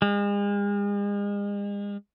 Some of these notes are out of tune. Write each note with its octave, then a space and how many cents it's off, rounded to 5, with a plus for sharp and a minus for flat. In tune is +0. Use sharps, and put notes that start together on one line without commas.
G#3 -40